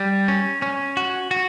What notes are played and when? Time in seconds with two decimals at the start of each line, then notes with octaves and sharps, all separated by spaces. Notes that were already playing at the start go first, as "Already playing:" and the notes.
Already playing: G3
0.28 C#4
0.62 C#4
0.97 F#4
1.31 F#4